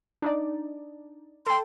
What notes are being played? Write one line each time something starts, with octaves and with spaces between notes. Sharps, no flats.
D4 D#4 D5
A4 G5 C6